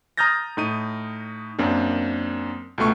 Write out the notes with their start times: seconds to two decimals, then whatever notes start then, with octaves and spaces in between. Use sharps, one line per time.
0.17 A#5 D#6 F6 G6 A6 A#6
0.57 A2 D#4 D#7
1.59 F#2 A#3 C4 D4
2.78 C#2 B2 A3 C#6